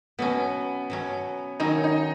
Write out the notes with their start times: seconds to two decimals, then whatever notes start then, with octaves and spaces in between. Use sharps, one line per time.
0.19 B2 F#3 B3 C#4
0.90 B2 F#3 C#4
1.60 D#3 F#3 C#4 D#4
1.84 D#4